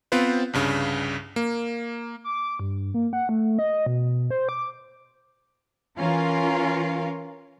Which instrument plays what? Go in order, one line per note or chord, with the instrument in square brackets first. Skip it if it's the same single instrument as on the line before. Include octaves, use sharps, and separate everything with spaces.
[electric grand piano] B3 C4 F4 B4 C5
C2 G2 C#3
A#3
[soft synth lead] D6
G2
A#3
F#5
A3
D#5
B2
C5
D6
[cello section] E3 C#4 F4 A#4 F5